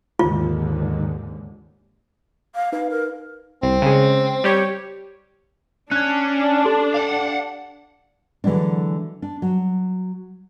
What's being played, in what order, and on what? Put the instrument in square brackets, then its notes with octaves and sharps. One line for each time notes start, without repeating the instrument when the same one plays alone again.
[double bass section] D#2 G#2 D3 [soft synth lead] D#3 [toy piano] F4
[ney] F5
[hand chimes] D#4 B4 [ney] F5
[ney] A#4
[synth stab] C2 [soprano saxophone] C4
[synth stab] C#3 G#3
G3 G4 C#5
[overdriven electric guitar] C#4 [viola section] D4 [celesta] F#6 G#6
[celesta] G4 A4 C6
[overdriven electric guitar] F5 F#5
[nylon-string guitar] D3 E3 F#3 G#3 D4
D4
F#3